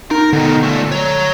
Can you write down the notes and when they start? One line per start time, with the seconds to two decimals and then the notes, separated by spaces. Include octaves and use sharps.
0.11 D#4 A#4
0.33 B2 D3 D#3
0.63 A#2 A3
0.92 C#5 A#5